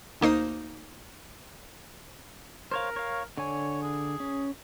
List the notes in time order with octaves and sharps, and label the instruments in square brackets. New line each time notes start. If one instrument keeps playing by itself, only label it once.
[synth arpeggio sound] D2 A#3 D#4 C5 D#6
[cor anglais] A#4 [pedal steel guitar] C5 C#5 F5
[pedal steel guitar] C#5 F5
[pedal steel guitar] D3 G#5 [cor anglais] C#5
[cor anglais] G#4
[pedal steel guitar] C#4